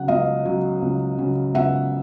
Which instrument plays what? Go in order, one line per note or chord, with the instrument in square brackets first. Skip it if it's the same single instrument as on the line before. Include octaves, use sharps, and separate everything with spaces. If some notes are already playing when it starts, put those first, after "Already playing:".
Already playing: [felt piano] C#3 F#3 F#5
C#2 D#5 F5
C#3 F#3
C#2
C#3 F#3
C#2 E5 F#5